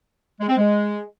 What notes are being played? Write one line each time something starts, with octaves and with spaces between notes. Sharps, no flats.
G#3
C4
G#3